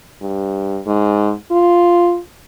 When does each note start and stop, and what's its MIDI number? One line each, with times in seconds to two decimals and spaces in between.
0.22 0.79 43
0.87 1.33 44
1.51 2.19 65